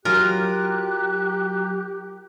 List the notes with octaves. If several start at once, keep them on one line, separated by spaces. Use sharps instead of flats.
F#3 F4 G4 A#4 A#5 D6 F#6